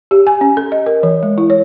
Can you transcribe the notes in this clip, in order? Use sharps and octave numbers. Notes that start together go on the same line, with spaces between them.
G4
G#5
C#4
A4
D#5
A#4
E3
G#3
E4
C#5